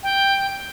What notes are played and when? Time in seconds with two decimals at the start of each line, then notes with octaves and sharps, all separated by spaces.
0.03 G5